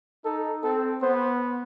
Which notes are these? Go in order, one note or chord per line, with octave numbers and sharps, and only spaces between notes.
D#4 A4
C4 A4
B3 C5